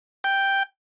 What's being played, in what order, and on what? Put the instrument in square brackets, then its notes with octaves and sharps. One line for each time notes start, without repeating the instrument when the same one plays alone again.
[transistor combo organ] G5